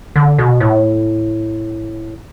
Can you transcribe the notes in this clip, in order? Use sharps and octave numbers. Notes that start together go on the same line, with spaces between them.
D3
B2
A2